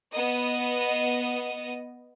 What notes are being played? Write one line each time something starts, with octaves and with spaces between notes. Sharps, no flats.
B3 D#5